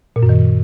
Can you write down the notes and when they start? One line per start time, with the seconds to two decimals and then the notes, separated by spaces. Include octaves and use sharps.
0.16 A#2
0.23 F#2
0.29 D#3